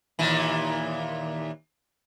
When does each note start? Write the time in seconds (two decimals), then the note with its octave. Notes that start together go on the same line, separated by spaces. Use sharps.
0.19 D#2 A#2 E3